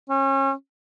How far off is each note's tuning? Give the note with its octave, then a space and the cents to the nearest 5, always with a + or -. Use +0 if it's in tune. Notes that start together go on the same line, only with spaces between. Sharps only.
C#4 -35